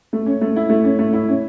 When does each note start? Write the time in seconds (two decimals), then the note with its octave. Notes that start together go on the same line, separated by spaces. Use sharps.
0.13 A3
0.26 C#4
0.41 A3
0.56 E4
0.70 A3
0.84 C#4
0.99 A3
1.13 E4
1.29 C#4